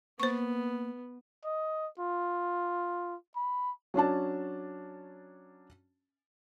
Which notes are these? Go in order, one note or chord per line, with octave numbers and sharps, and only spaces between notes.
A#3 B3 C5 C#6
D#5
F4
B5
F#3 C#4 D4 A5